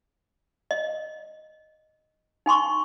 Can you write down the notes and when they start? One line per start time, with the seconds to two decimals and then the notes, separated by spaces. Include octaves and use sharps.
0.71 D#5
2.46 D#4 G#5 C6 C#6